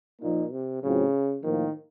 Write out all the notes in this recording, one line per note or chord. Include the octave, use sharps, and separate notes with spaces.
A#2 F3 A#3 D#4
C3
A2 C#3 F#3 C4 F4
A2 D#3 F3 A#3